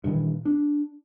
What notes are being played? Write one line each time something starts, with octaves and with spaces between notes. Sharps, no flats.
G2 A#2 D#3 E3
D4